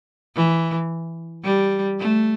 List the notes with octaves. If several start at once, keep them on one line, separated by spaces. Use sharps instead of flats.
E3
G3
A3